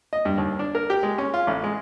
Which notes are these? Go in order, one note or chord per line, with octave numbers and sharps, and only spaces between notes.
D#5
G2
D#2
D4
A#4
G4
G#3
C#4
F4
A1
G#3